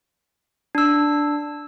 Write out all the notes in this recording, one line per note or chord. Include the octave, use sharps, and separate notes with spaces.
D4 E6